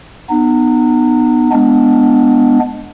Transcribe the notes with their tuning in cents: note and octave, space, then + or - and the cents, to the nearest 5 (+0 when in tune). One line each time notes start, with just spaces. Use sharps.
B3 +0 D#4 -35
G#3 +0 B3 +0 D4 +0